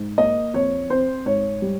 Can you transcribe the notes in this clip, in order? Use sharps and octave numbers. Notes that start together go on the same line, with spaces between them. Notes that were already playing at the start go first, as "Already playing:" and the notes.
Already playing: G#2
A#3 D#5
F2 C#5
C4 C5
G#2 C#5
G3